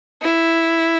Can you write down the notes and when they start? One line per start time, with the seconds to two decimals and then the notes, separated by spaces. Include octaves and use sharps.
0.22 E4